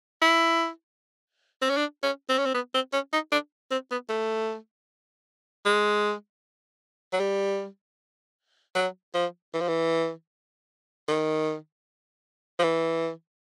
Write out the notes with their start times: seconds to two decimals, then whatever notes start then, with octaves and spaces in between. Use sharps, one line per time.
0.22 E4
1.62 C4
1.70 C#4
1.77 D4
2.03 C#4
2.29 C4
2.38 C#4
2.46 C4
2.54 B3
2.74 C4
2.93 C#4
3.13 D#4
3.32 D4
3.71 C4
3.91 B3
4.09 A3
5.66 G#3
7.13 F#3
7.20 G3
8.75 F#3
9.14 F3
9.54 E3
9.61 F3
9.68 E3
11.08 D#3
12.59 F3
12.63 E3